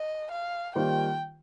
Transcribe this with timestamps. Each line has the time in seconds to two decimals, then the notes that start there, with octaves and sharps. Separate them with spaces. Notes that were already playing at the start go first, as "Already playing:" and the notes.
Already playing: D#5
0.32 F5
0.75 D#3 G3 A#3 F4 C5 G5